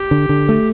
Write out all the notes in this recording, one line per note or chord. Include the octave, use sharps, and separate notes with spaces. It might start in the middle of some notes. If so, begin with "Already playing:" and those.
Already playing: G4
D3
D3
A3